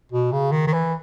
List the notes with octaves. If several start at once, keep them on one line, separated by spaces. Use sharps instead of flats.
B2
C#3
D#3
D#3
E3